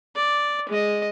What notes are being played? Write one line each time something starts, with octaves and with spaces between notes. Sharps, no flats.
D5
G#3 D#5